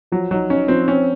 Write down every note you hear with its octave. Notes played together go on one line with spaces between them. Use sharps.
F3 F#3
F#3 D#4
C#4 D#4
F3 C4
C4 C#4